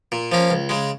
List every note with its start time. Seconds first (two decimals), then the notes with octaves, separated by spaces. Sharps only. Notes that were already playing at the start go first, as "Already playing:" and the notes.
0.12 A#2
0.32 F3 A#3 C#4
0.50 C#2
0.69 C#3 G#3